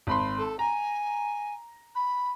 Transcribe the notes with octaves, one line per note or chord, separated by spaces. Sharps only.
G#1 B5 C6
A4
G#5 A#5
B5